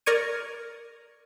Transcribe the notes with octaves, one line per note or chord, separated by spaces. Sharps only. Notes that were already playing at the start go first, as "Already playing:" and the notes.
A#4 D5 C#6 G#6 D#7